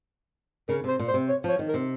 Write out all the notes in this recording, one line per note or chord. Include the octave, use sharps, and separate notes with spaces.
C#3 A#4
C3 C5
A#2
C5
C3
C#5
F3 C#5
D#3
A#4
C3